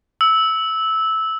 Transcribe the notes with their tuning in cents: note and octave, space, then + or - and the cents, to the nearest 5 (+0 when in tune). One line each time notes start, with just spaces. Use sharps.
E6 -15